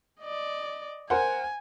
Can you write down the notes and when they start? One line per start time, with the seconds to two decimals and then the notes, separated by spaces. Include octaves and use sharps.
0.21 D5 D#5
1.10 A#4 C5 F#5 G#5